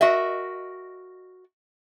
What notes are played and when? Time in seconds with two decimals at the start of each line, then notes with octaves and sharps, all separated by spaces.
0.01 F#4 A#4 D#5 E5